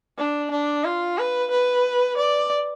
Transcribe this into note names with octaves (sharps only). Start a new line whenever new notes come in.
D4
D4
F4
B4
B4
D5